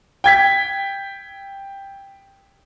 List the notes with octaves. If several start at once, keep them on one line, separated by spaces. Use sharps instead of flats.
G5 G#6 B6